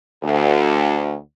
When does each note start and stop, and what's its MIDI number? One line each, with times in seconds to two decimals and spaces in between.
0.24 1.16 38